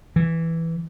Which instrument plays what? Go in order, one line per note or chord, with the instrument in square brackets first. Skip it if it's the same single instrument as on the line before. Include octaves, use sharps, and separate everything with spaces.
[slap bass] E3